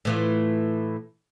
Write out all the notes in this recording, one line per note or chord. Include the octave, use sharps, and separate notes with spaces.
A2 E3 F4